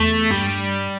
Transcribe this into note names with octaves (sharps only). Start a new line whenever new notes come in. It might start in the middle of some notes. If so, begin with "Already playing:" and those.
Already playing: E2 A3
G2 G3